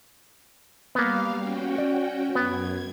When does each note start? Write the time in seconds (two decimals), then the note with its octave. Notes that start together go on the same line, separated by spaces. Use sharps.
0.95 G3 A#3 B3 F5
1.36 C#4 F#4 G5
1.78 D5
2.35 F#2 B3 G#6